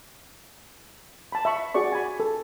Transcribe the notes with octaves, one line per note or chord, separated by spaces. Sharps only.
A5 B5
E5 B5 C#6
F#4 G#4 D5 C#6
G#5 B5
A4